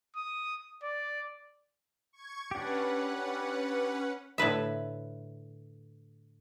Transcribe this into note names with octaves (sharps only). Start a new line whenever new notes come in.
D#6
D5
C#6 G#6
C#4 D4 G4 B4 F#5
A2 D3 B4 E5